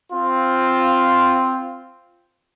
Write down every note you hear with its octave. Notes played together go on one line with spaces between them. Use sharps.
C4 F4